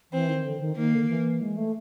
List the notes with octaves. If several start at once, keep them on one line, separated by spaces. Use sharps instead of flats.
E3 C4
D#3
D3
D#3
D#3 A#3
D3
D#3
E3
G#3
A3